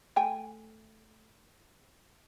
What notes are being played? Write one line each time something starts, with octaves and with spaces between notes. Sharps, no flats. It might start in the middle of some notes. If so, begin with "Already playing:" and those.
A3 G5 G#5